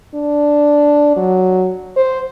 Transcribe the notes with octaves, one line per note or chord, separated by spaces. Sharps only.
D4
F#3
C5